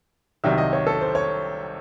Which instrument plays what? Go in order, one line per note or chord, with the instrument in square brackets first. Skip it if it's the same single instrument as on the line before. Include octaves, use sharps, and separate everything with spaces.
[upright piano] C2 C3 D#3 F#3 E5
D#5
C#5
A4
C5
C#5